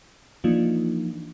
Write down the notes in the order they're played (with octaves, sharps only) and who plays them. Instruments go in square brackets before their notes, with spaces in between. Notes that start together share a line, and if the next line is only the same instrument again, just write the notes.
[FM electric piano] E3 F3 A#3 D4 D#4 F4